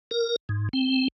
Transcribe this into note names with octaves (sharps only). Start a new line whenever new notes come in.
A#4
G#2
C4